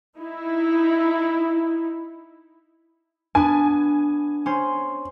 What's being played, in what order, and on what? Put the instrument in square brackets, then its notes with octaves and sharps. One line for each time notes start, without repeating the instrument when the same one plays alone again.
[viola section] D#4 E4
[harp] B3 D4 [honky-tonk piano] G#5
[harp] C#4 C5 C6